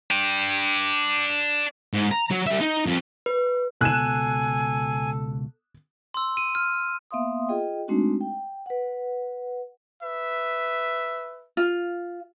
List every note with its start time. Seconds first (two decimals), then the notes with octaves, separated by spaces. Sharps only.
0.10 D4 G5
1.93 G#2
2.11 A#5
2.31 F#3
2.46 G3 E5
2.61 D#4
2.86 F2
3.26 B4
3.81 C#2 B2 A4 G#5 F#6 E7
6.14 C6 E6
6.37 D#7
6.55 F6
7.11 A#3 B3 E5 F5 C6 D#6
7.48 F4 G#4 D#5 G5
7.88 G#3 A3 C4 D4 D#4 F#4
8.21 G5
8.66 B4 F#5
10.03 B4 E5
11.57 F4